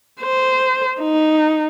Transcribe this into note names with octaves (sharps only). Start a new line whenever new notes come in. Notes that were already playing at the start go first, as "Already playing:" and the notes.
C5
D#4